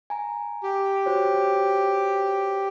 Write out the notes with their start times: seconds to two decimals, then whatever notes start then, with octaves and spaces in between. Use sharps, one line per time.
0.10 G#5 A#5
0.63 G4
1.06 F#4 C5 C#5